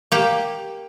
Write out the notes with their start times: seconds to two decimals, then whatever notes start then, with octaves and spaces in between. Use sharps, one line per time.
0.12 A#3 G4